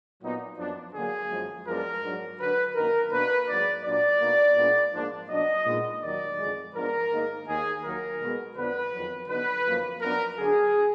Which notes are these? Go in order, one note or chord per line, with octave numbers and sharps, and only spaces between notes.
A#2 F#3 B3 D#4
F#2 F3 B3 D4
D3 F#3 A#3 G#4
F#2 F3 G#3
F#2 F3 G#3 B3 D4 A#4
G#2 F#3 D4
D3 F#3 D4 B4
F#2 D#3 A#3 D#4 A#4
B2 A#3 D4 B4
G#2 F#3 A#3 D5
A#2 F#3 D4 D5
B2 A#3 D#4
A#2 G#3 B3 D4
G#2 F3 A#3 D4
B2 F#3 D4 D#5
A#2 G#3 B3 D#4
D#2 D#3 F#3 D5
F2 D3 G#3
G#2 F3 B3 D4 A#4
G#2 D#3 A#3 D#4
D#2 D#3 A#3 D#4 G#4
D#2 D#3 F#3 A#3 D#4 A#4
B2 G#3 B3
F2 D3 F3 B3 D4 B4
F2 D#3 F#3
D3 F#3 B3 D#4 B4
F#2 F3 A#3
F#2 F3 B3 D4 A#4
D3 F#3 D4 G#4